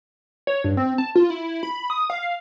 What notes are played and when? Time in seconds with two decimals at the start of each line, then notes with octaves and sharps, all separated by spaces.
0.47 C#5
0.64 G2
0.77 C4
0.98 A5
1.15 F4
1.30 E4
1.63 B5
1.90 D#6
2.10 F5